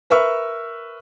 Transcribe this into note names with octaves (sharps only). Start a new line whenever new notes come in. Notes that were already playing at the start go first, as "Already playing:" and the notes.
A#4 B4 E5 C#6 E6 F6